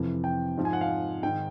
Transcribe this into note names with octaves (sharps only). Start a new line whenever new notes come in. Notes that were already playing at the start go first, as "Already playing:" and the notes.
Already playing: F2 C3 E3
G5
G#2 F3
G#5
F#5
F5
G#2 D#3 G5